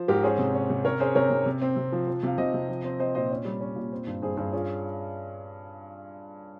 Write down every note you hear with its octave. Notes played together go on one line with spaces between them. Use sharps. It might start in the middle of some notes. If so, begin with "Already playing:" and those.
Already playing: F3 C5
G#2 G4 A#4
C#4 G#4 C5
C3
C#4
C3
C#4 A#4 C#5
C#4 G#4 C5
C3 A#4 C#5
C3
C3
C4
C3
F3
F3
C3 F5
C3 C5 D#5
C3
F3
C4
C4 C5 D#5
A#2 C5 D#5
C#4
G3
C#4
A#2
C4
G2
G2 G#4 C5
G2 G#4 C5
C#4 F4 G#4